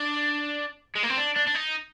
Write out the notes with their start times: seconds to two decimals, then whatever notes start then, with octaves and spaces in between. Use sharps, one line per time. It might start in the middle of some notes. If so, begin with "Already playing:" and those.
Already playing: D4
0.96 G#3
1.03 A#3
1.10 C4
1.17 D4
1.36 D4
1.47 D4
1.55 D#4